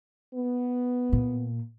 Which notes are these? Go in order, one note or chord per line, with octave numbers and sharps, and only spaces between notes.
B3
A#2